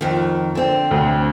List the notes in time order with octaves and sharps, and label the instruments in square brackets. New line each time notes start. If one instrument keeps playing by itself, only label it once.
[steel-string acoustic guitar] F2 D#3
D3 C4
[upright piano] D2